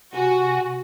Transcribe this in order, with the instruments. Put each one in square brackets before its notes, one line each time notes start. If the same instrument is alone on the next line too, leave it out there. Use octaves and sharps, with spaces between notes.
[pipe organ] C3 G#5 [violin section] F#4